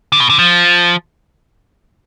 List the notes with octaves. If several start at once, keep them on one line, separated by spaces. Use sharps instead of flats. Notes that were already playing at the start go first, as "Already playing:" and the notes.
D3
B2
D3
F3